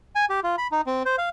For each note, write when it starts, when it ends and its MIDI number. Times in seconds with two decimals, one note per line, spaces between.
0.15 0.25 80
0.30 0.40 67
0.43 0.56 65
0.58 0.67 83
0.72 0.81 63
0.87 1.03 60
1.05 1.16 72
1.18 1.29 77